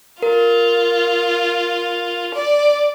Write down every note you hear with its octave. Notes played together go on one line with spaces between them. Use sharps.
F4 A#4
D5